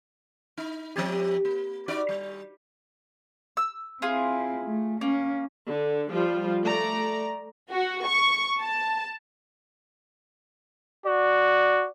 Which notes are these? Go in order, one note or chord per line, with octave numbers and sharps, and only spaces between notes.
D#4
F3 C4 G4
A#3
D#4 F#4 D5
G3
E6
C4 E4 F4 G#4
A3
A#3 C#4
D3
F3 G3 F4
A3 D5 A#5
F#4
C#6
A5
F#4 D5